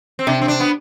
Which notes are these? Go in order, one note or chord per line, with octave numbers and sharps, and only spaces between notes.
C4
C3 D4
C4
D4
B3